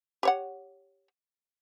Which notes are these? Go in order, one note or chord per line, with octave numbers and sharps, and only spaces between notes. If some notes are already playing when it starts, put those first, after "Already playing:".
G4 C#5 F#5